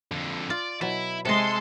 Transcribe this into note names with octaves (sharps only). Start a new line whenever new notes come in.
F2 D3
F4 D5
B2 F#3 E4
C3 G#3 A4 D#5 C6